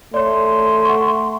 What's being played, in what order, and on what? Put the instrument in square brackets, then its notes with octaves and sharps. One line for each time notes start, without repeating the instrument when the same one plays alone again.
[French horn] A3 [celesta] C#5 D5 [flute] C6
[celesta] F#5 C#6